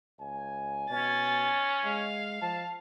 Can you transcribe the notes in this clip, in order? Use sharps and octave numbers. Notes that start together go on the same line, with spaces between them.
C#2 G#5
B2 C#4 A6
G#3 F5
F3 A5